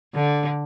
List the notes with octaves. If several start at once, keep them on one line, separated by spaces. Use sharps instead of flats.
D3